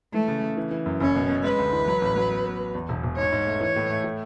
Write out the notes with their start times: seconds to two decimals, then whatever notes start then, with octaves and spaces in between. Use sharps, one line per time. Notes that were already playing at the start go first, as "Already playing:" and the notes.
0.13 E3 A3
0.28 C#3
0.43 C#3
0.57 E3
0.71 E3
0.86 F#2
1.00 F#1 C#4
1.15 B2
1.30 B2
1.44 G#3 B4
1.58 D2
1.73 E3
1.88 F#3
2.01 A1
2.16 F#3
2.31 B3
2.45 B3
2.60 B3
2.75 E2
2.89 E1
3.03 E1
3.17 G#2 C#5
3.32 G#2
3.46 A3
3.61 E3 C#5
3.76 A2
3.90 A3
4.04 A2